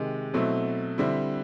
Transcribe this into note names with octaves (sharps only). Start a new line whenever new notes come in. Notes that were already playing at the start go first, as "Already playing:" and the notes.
Already playing: C3 D#3 G#3
B2 F#3 A3 C4 E4
D3 G3 C4 E4